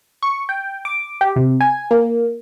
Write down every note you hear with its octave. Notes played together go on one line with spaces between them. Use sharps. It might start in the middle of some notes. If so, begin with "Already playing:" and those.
C#6
G5
D6
G4
C3
G#5
A#3